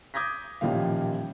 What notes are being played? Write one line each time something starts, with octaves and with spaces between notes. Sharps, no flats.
D6 D#6 G6 G#6 A#6 B6
A1 A#2 D#3 F3 G3 F5